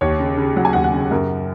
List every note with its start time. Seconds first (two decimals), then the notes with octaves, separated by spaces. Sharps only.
0.01 D#2 C#5
0.20 C#3
0.37 C#3
0.56 F#3 F#5
0.65 G#5
0.73 D#2 F#5
0.84 F#5
0.94 C#3
1.11 F#2 A#4